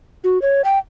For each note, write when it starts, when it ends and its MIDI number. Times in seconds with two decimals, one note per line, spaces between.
0.24 0.41 66
0.42 0.62 73
0.64 0.78 79